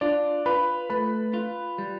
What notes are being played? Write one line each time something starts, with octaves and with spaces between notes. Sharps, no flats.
D4 F4 D5
F4 B4 B5
A3 B4 B5
F4
G3